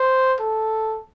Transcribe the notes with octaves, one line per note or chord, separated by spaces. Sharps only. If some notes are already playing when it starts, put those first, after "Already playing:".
Already playing: C5
A4